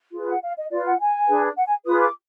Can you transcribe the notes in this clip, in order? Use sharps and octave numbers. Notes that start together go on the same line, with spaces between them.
F4 G#4 B4
F#5
F5
D#5
F4 B4 D5
F#5
G#5
D4 G#4 B4
F#5
G#5
F4 G#4 B4 D#6
D6